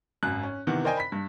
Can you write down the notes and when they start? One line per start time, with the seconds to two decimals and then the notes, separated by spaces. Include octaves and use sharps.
0.23 G#1 F#2 F#6
0.43 C#4
0.67 C3 D#3 E3 B3 F#5
0.85 A#4 C5 D5 D#5 G5 G#5
0.97 B5 B6
1.12 G2